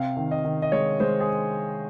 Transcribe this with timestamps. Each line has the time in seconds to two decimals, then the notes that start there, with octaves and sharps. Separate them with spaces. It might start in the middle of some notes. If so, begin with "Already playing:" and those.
Already playing: C3 F5
0.17 D#3
0.31 D#5
0.45 D#3
0.62 D#5
0.72 G#3 C#5
1.00 G#3 C5
1.21 G#4